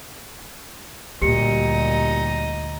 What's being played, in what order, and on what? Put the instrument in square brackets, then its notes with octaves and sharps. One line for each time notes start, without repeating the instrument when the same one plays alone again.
[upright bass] D2 [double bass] A#2 G3 [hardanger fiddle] D#4 D#5 [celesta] G4 C#7